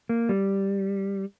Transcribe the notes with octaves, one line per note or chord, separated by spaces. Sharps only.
A#3
G3